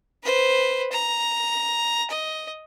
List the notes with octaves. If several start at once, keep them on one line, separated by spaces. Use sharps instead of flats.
B4 C5
A#5
D#5